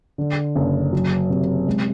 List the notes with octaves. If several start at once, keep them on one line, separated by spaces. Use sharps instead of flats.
D3
F#1
F#3
C3
G#3